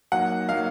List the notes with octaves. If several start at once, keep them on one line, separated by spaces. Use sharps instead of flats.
F#3 A#3 D#4 F#5
F#3 A#3 D#4 F5